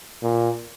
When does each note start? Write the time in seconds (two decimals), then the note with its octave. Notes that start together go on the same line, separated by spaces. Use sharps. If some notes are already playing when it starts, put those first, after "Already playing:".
0.22 A#2